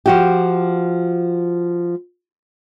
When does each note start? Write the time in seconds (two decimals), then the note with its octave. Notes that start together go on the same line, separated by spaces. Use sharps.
0.06 F3 F#4 G4